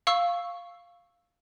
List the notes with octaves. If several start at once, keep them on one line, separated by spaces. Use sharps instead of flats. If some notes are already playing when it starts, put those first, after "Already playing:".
F5 C#6 E6